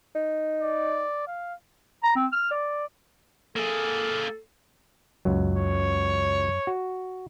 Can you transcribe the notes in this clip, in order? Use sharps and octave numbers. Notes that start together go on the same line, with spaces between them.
D#4
D5
F5
A#5
C4
F6
D5
A#3 G#4 A4
C#2 F#2 F#3
C#5
F#4